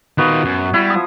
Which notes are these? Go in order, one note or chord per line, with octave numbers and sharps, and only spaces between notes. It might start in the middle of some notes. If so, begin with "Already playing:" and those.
D#3 B3 F4 F#4
F#2
G3 E4
F3 D#6